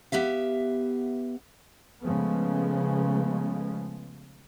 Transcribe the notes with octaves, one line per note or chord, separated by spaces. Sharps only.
B3 G4 E5 F5
C#3 F3 G#3 A3 B3